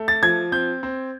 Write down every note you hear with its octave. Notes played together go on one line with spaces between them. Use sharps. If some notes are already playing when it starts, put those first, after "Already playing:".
Already playing: A3
A6
F3 G#6
C4 G6
C4